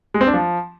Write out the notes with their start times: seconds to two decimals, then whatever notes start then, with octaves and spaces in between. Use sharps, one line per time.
0.14 G#3
0.21 C4
0.27 D4
0.34 F3